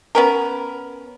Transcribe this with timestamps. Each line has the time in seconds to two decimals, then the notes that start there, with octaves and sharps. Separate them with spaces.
0.15 B3 C#4 A#4